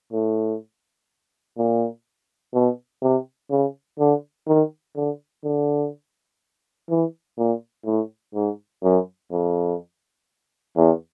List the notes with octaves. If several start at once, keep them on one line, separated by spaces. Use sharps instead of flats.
A2
A#2
B2
C3
C#3
D3
D#3
D3
D3
E3
A#2
A2
G#2
F#2
F2
E2